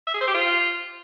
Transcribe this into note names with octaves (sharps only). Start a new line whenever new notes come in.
E5
G#4
C5
G4
F4